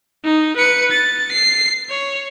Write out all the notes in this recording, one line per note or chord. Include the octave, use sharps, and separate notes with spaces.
D#4
B4 C#7
A6
C7
C#5